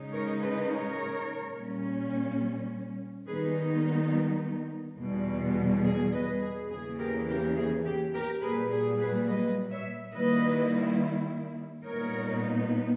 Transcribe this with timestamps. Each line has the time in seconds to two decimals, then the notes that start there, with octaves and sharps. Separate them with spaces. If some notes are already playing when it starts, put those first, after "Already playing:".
Already playing: C#3 G#3 D#4
0.12 A#4 C#5
0.41 B4 D#5
0.69 A#4 C#5
1.55 A#2 G3 C#4
3.27 D#3 G3 B3 D#4 G#4 B4
4.99 E2 B2 G3
5.84 G#4
6.13 B4 D#5
6.42 G#4
6.70 E2 C#3 E3 A#3 G#4
6.99 G4 A#4
7.28 G4 A#4
7.56 G#4
7.85 G4
8.14 G4 A#4
8.42 A#2 G3 A#3 G#4 B4
8.71 G#4
8.99 G#4 B4
9.28 B4 D#5
9.70 C#5 E5
10.13 D#3 G3 A#3 E4 B4 D#5
11.85 A#2 G3 B3 D#4 A#4 C#5